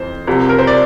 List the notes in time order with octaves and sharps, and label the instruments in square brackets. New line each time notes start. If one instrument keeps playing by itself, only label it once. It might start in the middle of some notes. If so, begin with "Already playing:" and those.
Already playing: [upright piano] F2 E3 C5
C2 C3 F3
A#4
C5
D5